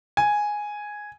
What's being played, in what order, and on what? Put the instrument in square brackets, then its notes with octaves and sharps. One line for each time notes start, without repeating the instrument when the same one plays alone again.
[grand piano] G#5